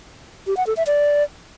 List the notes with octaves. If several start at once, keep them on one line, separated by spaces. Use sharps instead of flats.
G4
F#5
A4
E5
D5